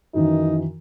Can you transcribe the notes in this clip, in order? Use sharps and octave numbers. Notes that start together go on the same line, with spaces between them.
F#2 D#3 E3 D#4